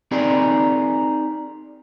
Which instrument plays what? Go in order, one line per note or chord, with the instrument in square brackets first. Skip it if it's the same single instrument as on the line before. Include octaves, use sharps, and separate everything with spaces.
[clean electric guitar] C4 D#4 G4 G#4 A#4 D5